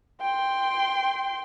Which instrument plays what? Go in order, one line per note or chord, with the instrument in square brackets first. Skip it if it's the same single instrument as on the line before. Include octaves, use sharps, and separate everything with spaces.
[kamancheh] G5 C6